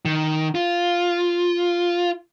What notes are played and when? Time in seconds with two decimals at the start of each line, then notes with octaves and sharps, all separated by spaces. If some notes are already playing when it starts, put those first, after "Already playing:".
0.05 D#3
0.55 F4